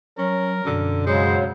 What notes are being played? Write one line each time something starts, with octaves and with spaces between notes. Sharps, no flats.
F#3 C#4 A#4
F#2 B2 D3
C#3 F#3 G#3 C5